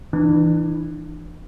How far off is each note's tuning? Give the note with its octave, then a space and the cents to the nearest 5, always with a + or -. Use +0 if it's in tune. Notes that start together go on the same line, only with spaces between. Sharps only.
E3 +0 D4 +40